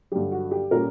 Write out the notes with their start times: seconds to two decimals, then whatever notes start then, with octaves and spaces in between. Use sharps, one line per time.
0.12 G2 D3 F#3 G4
0.32 F#4
0.51 G4
0.71 A#2 G3 C#4 A#4